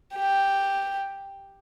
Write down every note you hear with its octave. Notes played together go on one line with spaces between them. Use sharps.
G4